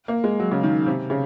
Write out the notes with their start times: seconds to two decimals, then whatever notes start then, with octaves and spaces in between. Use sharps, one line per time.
0.08 A#3
0.24 G#3
0.40 F#3
0.51 C#3
0.63 D#3
0.86 C3
1.10 C#3